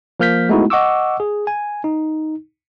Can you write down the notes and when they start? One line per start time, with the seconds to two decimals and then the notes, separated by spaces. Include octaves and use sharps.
0.20 F3 A#3 F6 G6 B6
0.49 G#3 A3 B3 D#4 E4 F#4
0.70 D#5 F#5 C#6 D6 E6
1.20 G#4
1.47 G#5
1.84 D#4